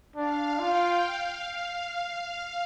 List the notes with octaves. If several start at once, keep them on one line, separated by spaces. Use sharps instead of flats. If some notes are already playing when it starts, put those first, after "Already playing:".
D4 F5
F4 G5
F5